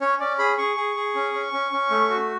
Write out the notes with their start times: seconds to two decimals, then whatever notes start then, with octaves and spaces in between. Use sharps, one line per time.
0.01 C#4 C#5
0.20 C#4 D5
0.39 G#4 B5
0.58 G#4 C#6
0.77 G#4
0.96 G#4
1.15 C#4
1.34 C#4
1.53 C#4
1.72 C#4
1.90 A3
2.09 F#4